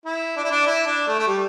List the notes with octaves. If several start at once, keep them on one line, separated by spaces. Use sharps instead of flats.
E4
D4
E4
D4
E4
D4
A3
A3
G3